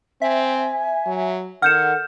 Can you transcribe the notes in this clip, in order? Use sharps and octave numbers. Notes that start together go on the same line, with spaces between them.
C4 E5 G#5
F#3
D#3 A4 F#5 F6 G6 E7